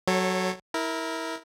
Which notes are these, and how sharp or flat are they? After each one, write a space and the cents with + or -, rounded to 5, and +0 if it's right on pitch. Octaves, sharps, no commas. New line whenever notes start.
F#3 +10 A4 +0 C#5 -20
E4 -20 A#4 +0